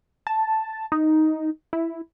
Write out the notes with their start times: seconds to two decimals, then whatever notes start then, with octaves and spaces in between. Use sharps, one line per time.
0.27 A5
0.92 D#4
1.73 E4